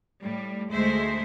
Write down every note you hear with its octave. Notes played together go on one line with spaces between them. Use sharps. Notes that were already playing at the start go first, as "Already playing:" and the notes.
A2 G3
D2 G#3 A3 G#4 C5 E5